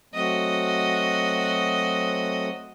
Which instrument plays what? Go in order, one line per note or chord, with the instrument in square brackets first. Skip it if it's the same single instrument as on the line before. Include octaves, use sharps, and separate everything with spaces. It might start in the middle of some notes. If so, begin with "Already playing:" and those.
[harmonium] F#3 A3 C4 [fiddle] F#4 D#5